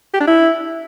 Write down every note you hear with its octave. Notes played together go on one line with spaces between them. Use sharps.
G4
D4
E4